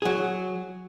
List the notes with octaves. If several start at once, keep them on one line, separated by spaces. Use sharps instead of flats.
F#3 G#4